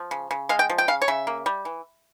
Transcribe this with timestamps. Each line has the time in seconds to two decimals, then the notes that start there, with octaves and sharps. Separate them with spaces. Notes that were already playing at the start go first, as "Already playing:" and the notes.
Already playing: F3
0.11 C#3
0.31 C#3
0.49 G#3 F5
0.59 G5
0.70 F3
0.78 G5
0.88 C#3 F5
1.02 C#5
1.08 C#3 E5
1.27 A#3
1.46 G3
1.65 E3